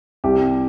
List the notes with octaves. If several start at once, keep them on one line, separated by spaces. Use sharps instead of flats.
C2 G4